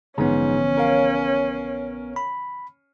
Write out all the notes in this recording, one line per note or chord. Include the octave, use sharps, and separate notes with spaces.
A#1 G#2 D3 E3 F3 B3 C#4
A#4 C#5 F5
B5